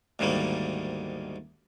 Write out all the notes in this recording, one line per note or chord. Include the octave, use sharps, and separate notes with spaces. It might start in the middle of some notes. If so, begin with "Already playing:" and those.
D2 G#2 D#3 G3 A#3